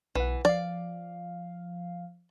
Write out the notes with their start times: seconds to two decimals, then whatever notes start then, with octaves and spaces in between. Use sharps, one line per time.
0.15 B1 E3 F#5
0.45 F3 D5 F5